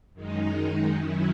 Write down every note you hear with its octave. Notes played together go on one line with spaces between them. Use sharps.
F#2 D#3 G#3 D#4
F#2 D#3 F#3 C#4 E4